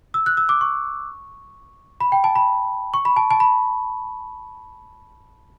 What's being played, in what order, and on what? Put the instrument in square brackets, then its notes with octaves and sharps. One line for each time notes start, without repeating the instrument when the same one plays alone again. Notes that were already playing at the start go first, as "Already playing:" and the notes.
[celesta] E6
F#6
E6
D6
C#6
B5
G5
A5
B5
C#6
B5
A5
A5
B5